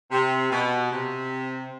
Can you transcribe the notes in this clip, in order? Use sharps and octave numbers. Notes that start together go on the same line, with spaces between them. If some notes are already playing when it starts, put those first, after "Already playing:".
C3
B2
C3